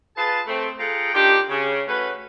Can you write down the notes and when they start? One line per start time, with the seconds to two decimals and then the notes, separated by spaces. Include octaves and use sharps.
0.16 F4 G#4 B4 A5
0.47 A3 C4
0.79 F4 G#4 A4 F#5 G5 A#5
1.14 D#3 D4 D#4 F4 G4
1.49 C#3
1.88 A3 C#4 F#4 B4